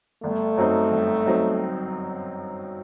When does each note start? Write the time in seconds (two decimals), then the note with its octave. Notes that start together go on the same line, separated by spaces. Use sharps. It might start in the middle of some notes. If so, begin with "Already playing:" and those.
0.23 G1 A3
0.57 F#2 F#3 C4 D#4
0.91 G1
1.26 F#3 C4 D#4